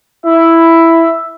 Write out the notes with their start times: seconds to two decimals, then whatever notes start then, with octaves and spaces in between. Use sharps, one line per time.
0.25 E4 E5